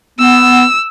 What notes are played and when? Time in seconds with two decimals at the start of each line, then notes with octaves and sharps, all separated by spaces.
0.19 B3 E6